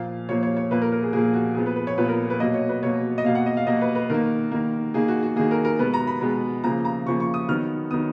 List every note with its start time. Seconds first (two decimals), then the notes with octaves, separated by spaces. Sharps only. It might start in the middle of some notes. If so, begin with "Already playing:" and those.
Already playing: A#2 F3 A#3 F5
0.28 A#2 F3 A#3 C#5
0.43 C#5
0.57 C#5
0.71 A#2 F3 A#3 B4
0.82 A#4
0.92 A#4
1.02 G#4
1.13 A#2 F3 A#3 G#4
1.34 F#4
1.55 A#2 F3 B3 G#4
1.66 B4
1.76 B4
1.87 C#5
1.98 A#2 F3 B3 B4
2.08 A#4
2.30 B4
2.40 B2 F#3 A#3 D#5
2.54 C#5
2.69 B4
2.83 B2 F#3 A#3 C#5
3.18 D#5
3.25 B2 A#3 F5
3.35 F#5
3.46 D#5
3.57 F5
3.67 B2 A#3 D#5
3.81 B4
3.95 B4
4.10 D#3 A#3 A#4
4.52 D#3 A#3
4.94 D#3 A#3 G#4
5.08 F#4
5.23 F#4
5.36 D#3 A#3 G#4
5.51 A#4
5.65 A#4
5.79 B2 G#3 B3 B4
5.94 A#5
6.07 B5
6.21 B2 G#3 B3
6.64 C#3 F3 A#3 A#5
6.85 A#5
7.06 C#3 F3 A#3 C#6
7.20 C#6
7.34 D#6
7.49 D#3 F#3 B3 F6
7.91 D#3 F#3 B3 D#6